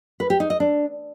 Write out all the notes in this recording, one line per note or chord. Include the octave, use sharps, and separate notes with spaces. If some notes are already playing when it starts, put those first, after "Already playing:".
B4
G4
D#4
D#5
D4